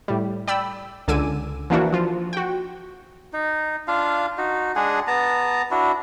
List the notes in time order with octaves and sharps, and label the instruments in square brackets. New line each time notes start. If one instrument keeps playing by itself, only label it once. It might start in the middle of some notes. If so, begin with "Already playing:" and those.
[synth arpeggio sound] A2 G3
D5 G5 B5 E6
C#2 D3 G#5 D6 E6 D#7
E3 F3 A#3 D4 E4 F#4
F3 F4
F#4 G5
[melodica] D#4
D4 F4 F5
D#4 F#4
G#3 D4 G#4 F#5
B3 A5 A#5
D4 E4 F#4